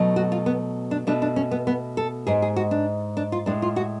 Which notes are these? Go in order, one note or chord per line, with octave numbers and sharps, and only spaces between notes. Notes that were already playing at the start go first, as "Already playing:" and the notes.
Already playing: B2 F#3 A3
F#4
F4
B3
D4
B2 A3 D4
D4
C#4
B3
B3
A4
G#2 G#3 G#4
G#4
F#4
D4
D4
F4
A2 G#3 D4
F4
F#4